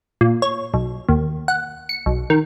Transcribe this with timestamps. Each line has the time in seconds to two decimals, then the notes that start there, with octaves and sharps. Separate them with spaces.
0.21 A#2
0.42 C#5
0.74 B1
1.09 D#2
1.48 F#5
1.89 C#7
2.06 B1
2.30 D#3